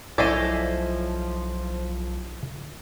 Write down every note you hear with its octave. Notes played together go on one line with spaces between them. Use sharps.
B1 F3 A3 C#4 E4 C5 D5 D#5